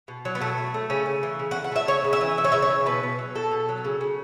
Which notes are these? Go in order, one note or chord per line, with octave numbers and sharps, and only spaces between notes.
B2
F#3
B3
B2 A3
A3
A3
C#3 C#4
C#3
E3
C#3
F#4
A3
F#5
A3 E5
C#3 C#5
C#3
E5
E3
C#3 E5
C#5
C#3 E5
C#5
E3
B2 B4
B2
F#3
B2 A4
B2
F#3
C#3
C#3